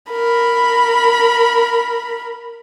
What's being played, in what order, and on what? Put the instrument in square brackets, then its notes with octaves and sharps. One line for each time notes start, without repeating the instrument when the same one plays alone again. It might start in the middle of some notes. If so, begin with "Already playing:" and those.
[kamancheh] A#4 B5